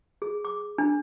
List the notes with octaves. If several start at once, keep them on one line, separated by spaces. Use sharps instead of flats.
G#4
D6
D4